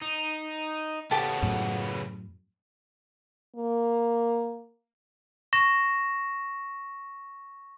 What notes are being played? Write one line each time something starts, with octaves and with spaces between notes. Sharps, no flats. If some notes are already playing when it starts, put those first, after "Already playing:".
D#4
C#3 B3 G4 A4
F#2 A2
A#3
C#6 A#6 E7